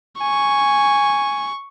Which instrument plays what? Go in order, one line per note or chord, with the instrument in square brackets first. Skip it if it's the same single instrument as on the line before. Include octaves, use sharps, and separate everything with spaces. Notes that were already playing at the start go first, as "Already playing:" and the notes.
[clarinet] G#5 [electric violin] C#6